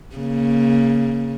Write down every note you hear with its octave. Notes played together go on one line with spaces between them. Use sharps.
C#3 A#3